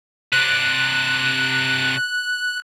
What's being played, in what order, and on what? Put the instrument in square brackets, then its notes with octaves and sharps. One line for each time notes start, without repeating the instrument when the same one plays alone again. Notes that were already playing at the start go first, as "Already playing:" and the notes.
[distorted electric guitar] C3 D4 [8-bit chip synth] F#6